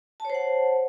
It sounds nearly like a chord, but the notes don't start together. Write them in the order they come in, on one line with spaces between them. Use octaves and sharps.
A5 C#5 C5 F#5